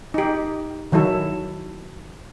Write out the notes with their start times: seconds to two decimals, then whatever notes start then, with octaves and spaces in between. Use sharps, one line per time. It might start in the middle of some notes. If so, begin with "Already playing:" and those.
0.14 D#4 G4
0.92 D#3 F#3 E4 A4